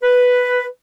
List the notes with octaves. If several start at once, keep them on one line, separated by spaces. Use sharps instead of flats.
B4